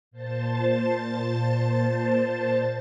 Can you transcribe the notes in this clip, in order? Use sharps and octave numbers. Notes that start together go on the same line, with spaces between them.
A#2 C5 A5 A6